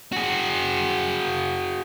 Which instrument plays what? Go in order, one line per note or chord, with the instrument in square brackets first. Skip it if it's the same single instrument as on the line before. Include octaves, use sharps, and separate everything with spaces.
[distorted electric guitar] F#4 G#4